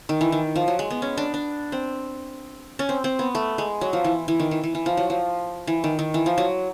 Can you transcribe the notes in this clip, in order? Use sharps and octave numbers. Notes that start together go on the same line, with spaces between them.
D#3
E3
D#3
F3
F#3
G#3
B3
C#4
D4
D4
C4
C#4
C4
C4
B3
A3
G#3
F#3
F3
E3
E3
D#3
E3
E3
E3
F3
F#3
F3
E3
D#3
D#3
E3
F3
F#3